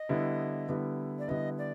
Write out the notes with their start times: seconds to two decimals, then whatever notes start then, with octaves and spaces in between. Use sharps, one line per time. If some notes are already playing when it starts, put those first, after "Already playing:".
Already playing: D#5
0.09 D3 G3 B3 E4
0.68 D3 G3 B3 E4
1.19 D5
1.28 D3 G3 B3 E4 D#5
1.58 D5